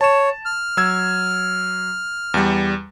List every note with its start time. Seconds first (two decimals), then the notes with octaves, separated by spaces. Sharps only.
0.01 C#5 A5 E7
0.46 F6
0.77 F#3 E6 G#6
2.34 E2 G3